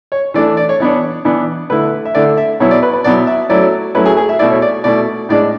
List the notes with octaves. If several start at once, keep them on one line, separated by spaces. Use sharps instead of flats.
C#5
E3 A3 D4 D5
D5
C#5
E3 B3 D4 C#5
E3 B3 D4
D3 A3 E4 B4
E5
D3 A3 E4 D5
E5
B2 F#3 B3 E4 C#5
D5
B4
B4
B2 F#3 B3 E4 D5
E5
F#3 A3 C#4 E4 D5
F#3 A3 C#4 E4 B4
G#4
G#4
E5
B2 A3 E4 D5
C#5
D5
B2 A3 E4 D5
A2 G#3 D4 D5